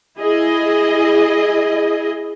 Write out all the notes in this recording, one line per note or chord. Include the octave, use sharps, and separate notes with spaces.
E4 G#4 D#5